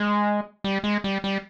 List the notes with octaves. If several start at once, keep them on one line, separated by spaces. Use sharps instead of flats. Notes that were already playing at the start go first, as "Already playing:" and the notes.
Already playing: G#3
G3
G#3
G3
G3